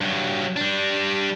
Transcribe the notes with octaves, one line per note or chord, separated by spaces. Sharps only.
G2 F#3
G3 D4